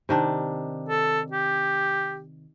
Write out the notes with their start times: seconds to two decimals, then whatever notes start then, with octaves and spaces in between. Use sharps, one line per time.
0.09 C3 D#3 D4
0.89 A4
1.32 G4